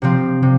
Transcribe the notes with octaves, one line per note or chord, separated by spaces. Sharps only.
C3 F3 C4
C3